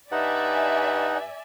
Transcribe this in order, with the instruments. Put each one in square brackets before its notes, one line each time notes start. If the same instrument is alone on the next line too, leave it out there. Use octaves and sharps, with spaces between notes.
[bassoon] G2 [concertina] D#4 F#5 [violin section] D5 E5 G#5